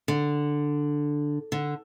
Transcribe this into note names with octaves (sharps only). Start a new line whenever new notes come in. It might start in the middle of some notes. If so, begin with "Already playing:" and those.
D3
D3